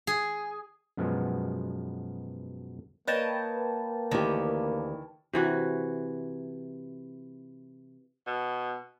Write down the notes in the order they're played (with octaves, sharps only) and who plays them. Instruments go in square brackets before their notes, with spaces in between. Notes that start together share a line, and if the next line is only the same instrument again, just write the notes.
[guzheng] G#4
[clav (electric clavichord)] F#2 B2 F3 G#3 B3
[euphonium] A#3 [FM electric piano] B4 G5 A5 [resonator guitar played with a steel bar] C#5 D#5
[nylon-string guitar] D2 G4 [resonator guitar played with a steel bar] D#3 E3
[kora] C3 E3 F#4
[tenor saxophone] B2